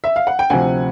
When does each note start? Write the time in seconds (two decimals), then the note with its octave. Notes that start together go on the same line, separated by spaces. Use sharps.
0.04 E5
0.16 F5
0.27 F#5
0.39 G5
0.50 D2 C3 F3 F#5 G#5